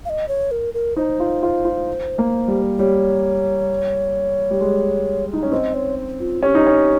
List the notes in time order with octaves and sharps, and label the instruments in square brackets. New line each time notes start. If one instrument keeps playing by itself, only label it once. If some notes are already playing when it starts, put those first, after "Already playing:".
[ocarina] F5
D#5
C#5
A#4
A#4
[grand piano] D#4 [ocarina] C5
[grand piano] F4
F4
F4
A#3
G3
[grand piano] G3 [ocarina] C#5
[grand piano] G3
G#3
D#4
C#4
[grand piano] C4 [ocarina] D#5
[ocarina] C#5
F4
[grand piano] C#4 [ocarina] G4
[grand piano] D#4
C#4